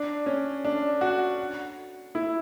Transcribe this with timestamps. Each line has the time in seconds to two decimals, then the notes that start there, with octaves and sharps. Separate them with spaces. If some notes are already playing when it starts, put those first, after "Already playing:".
Already playing: D4
0.26 C#4
0.64 D4
1.01 F#4
2.15 E4